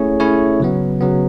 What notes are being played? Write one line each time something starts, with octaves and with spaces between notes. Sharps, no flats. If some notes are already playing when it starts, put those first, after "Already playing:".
Already playing: A3 C#4 E4 G#4 C#5
A3 C#4 E4 G#4 C#5
C#3 F#3 B3
C#3 F#3 B3